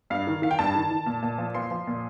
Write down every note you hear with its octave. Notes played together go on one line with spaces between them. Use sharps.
G2 F5
D#3
D#3 F5
G5
G2 A5
D#3
D#3
A#2
A#2
F3
F3 C6
F3
A#2